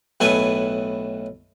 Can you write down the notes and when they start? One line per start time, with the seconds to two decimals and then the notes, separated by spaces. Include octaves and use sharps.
0.20 B1 A2 A4 B4 G#5